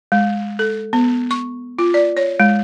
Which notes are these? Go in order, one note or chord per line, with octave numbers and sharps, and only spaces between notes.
G#3
A4
B3
C#6
F4
D5
C#5
G#3